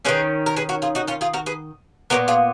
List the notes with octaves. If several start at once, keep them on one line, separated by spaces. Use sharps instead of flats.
D#3 G#3 C#4 G#4 B4
A#4
G#4 B4
F#4 A#4
F4 G#4
D#4 F#4
C#4 F4
F4 G#4
F#4 A#4
G#4 B4
A#2 G#3 B3 A#4 C#5
F4 G#4